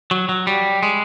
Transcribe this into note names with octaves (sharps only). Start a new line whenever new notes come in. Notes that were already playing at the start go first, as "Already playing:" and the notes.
F#3
F#3
G3
G#3